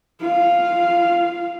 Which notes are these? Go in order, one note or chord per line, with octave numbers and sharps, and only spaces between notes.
F4 F5